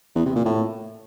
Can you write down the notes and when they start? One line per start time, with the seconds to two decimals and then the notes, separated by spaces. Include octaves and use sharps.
0.15 E2
0.25 C3
0.35 A#2
0.45 A2